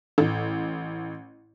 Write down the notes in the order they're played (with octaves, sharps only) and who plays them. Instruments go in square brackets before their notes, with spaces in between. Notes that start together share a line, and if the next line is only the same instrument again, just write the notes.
[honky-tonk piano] A1